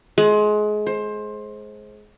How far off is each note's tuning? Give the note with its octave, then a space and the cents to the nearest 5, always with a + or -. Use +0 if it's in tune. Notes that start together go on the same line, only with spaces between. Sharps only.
G#3 +25
C5 +20